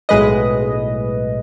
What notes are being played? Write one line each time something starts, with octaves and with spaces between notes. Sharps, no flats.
B1 A2 G#3 B4 D#5